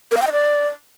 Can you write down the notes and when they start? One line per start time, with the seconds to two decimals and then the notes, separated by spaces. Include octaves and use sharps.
0.11 A#4
0.17 F5
0.22 G5
0.27 D#5
0.32 D5